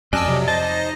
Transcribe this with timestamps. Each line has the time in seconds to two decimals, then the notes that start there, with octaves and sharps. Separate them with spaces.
0.13 F2 D5 D#5 G#5 A5 E6
0.28 C3 F#3
0.48 C5 D#5 A5
0.62 D#4